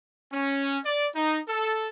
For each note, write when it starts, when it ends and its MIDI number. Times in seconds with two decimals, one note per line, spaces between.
0.32 0.77 61
0.84 1.07 74
1.14 1.38 63
1.48 1.88 69